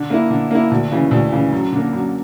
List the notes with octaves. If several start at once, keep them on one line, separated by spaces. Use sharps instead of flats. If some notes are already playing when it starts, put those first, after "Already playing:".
Already playing: D3
A#3 E4
D3
A#3 E4
D2
C#3 E3
D2
C#3 E3
F#2
D3 A#3
F#2